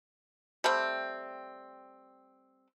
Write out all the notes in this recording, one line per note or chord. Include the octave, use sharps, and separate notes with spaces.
G3 A3 C4